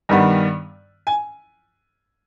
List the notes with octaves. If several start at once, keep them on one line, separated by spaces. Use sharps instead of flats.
G2 D#3 G3 B3
G#5